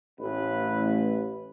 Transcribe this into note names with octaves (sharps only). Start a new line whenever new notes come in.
A1 B4